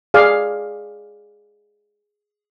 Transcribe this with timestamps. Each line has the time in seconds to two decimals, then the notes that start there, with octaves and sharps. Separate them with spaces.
0.14 G#4 D5 F5